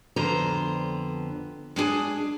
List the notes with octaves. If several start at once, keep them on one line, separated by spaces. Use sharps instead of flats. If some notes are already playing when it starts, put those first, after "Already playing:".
F2 D3 B3 C5 A#5
G#3 D4 G#4